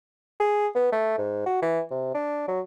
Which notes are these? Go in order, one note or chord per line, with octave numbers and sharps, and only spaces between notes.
G#4
B3
A3
G#2
F#4
E3
C3
D4
F#3